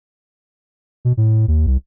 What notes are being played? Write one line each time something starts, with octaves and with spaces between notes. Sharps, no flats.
B2
A2
D#2
C2